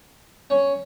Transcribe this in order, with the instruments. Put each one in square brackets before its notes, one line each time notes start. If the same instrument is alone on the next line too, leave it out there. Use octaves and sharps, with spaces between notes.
[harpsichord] C#4